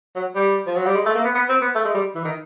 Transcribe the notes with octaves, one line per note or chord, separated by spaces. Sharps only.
F#3
G3
F3
F#3
G3
G#3
A3
A#3
B3
B3
C4
B3
A3
G#3
G3
E3
D#3